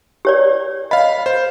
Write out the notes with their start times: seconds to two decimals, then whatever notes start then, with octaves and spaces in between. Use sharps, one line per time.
0.25 G4 C#5 D5
0.91 D#5 F5 B5
1.26 C5